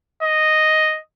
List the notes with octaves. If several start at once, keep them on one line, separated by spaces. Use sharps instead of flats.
D#5